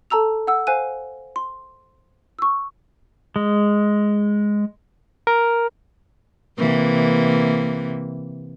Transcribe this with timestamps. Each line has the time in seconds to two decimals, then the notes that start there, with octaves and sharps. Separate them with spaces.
0.10 A4 A5 A#5 E6 F7
0.47 F#5 E6
0.67 C5 F5 G#5 F#6 D#7
1.36 C6
2.39 C#6 E6
3.36 G#3
5.27 A#4
6.59 C3 E3 A#3